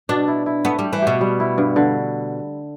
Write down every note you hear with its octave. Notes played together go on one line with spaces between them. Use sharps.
B2 D4
E4
E4
A3 B3
G3
G4
E3
B2 G4
G3
E4
G2
D3